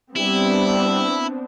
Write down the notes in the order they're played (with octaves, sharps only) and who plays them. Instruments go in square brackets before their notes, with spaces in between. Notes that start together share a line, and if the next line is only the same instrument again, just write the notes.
[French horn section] G3 [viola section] B3 C4 D4 [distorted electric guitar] E4